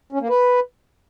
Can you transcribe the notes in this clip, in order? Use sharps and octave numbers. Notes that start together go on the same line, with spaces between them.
C#4
A#3
B4